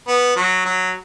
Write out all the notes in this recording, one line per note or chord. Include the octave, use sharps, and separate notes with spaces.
B3
F#3
F#3